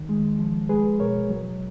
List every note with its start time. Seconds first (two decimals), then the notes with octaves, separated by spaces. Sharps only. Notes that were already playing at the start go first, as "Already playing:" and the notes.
Already playing: D#3
0.09 G#3
0.39 F3
0.69 G#3 G#4 B4
1.00 B2 A#4 C#5
1.30 F#3